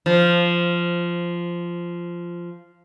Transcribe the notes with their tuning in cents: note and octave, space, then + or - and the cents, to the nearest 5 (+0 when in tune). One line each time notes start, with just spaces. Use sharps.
F3 -10